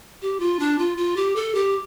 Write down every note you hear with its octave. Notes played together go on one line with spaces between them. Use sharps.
G4
F4
D4
F4
F4
G4
A4
G4